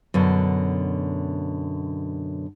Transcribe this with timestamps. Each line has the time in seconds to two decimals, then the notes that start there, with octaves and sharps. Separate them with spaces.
0.14 F#2 B2 D3